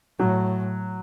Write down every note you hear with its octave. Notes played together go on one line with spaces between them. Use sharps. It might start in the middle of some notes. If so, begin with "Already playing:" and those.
A2 F#3